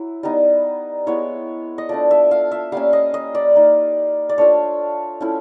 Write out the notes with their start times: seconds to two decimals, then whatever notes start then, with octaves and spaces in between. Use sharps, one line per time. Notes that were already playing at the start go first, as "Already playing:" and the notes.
Already playing: F#3 E4
0.23 G3 B3 D#4
1.07 G#3 B3 E4 C#5
1.78 D#5
1.89 F3 A3 D4 D5
2.11 E5
2.31 F5
2.52 E5
2.72 G3 A#3 C#4 F5
2.93 D#5
3.14 D#5
3.35 D5
3.55 A#3 D#4
4.29 D5
4.38 A3 D4 F4 C#5
5.21 F3 A3 C#4 E4